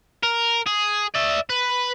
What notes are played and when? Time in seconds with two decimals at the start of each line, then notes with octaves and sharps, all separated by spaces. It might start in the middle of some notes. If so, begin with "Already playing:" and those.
0.23 A#4
0.67 G#4
1.15 D5 E5
1.50 B4